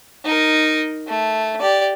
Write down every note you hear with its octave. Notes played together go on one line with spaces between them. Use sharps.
D#4 A#4
A3
G4 D5